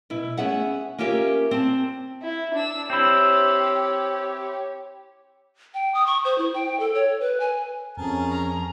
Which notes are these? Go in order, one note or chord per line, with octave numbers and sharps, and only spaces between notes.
B2 E4
A3 B3 C#4 G#4 E5 F#5
A#3 C#4 F4 G4 A#4 E5
C4 A5
E4
D4 E6
C4 E4 G4 C#5
G5
D#6
C#6
C5
E4
G5
A4
C#5
B4
G#5
F2 C#4 G#4 A#4 A5
A#5